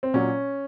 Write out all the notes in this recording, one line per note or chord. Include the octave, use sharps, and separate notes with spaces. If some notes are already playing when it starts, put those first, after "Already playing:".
C4
A#2 F#3 C#4